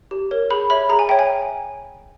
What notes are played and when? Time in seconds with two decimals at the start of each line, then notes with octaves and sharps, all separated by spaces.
0.11 G4
0.31 A#4 C#5
0.50 G#4 B5
0.70 C#5 E5 B5
0.89 G#4 A#5
0.99 G#5
1.09 C#5 E5 G5
1.19 G#5